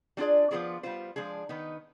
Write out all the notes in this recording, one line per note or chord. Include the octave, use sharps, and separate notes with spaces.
G3 D4 F4 G#4 D5
F3 B3 F4 G#4 D5
G3 B3 F4 C5
F3 G#3 D4 G#4
D#3 B3 D#4 B4